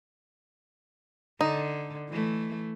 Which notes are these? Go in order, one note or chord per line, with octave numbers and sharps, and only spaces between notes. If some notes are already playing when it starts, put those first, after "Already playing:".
D3 D#4
E3 A3